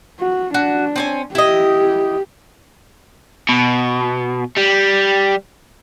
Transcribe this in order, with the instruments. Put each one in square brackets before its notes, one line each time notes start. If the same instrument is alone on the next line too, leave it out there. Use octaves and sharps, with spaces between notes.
[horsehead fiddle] F#4
[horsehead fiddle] D4 [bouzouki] F#4
[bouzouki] C4 C#4 G#5
[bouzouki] E4 D#5 [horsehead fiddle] G4
[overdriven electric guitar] B2
G3